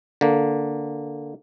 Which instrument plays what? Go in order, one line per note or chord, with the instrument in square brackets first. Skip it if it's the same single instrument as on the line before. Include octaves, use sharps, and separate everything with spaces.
[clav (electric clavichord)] D3 A#3